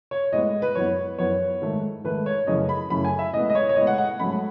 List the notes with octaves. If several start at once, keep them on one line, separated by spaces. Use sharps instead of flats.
C#5
A2 G#3 B3 D#5
B4
F#2 E3 B3 C#5
F#2 E3 B3 C#5
G#2 D#3 A3
G#2 D#3 A3 B4
C#5
F#2 C#3 E3 A3 C#4 D#5
B5
F#2 C#3 E3 A3 C#4 B5
G#5
E5
A2 G#3 B3 D#5
D#5
C#5
C#5
A2 G#3 B3 D#5
F#5
F#5
G#2 F#3 A3 C#4 B5